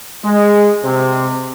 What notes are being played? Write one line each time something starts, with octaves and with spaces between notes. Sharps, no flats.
G#3
C3